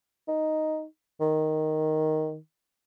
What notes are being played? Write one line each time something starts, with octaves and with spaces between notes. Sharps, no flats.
D#4
D#3